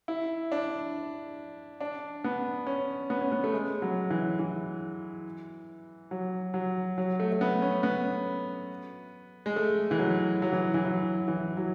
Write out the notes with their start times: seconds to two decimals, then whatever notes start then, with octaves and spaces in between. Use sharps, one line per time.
0.08 E4
0.52 D4
1.81 D4
2.24 B3
2.67 C#4
3.10 B3
3.21 C#4
3.32 B3
3.44 A3
3.53 G#3
3.82 F#3
4.11 E3
4.39 E3
6.11 F#3
6.54 F#3
6.98 F#3
7.20 A3
7.32 A3
7.41 B3
7.62 C#4
7.83 B3
9.46 G#3
9.56 A3
9.91 E3
9.99 F#3
10.42 F#3
10.52 E3
10.74 E3
10.85 F#3
11.28 E3
11.57 F#3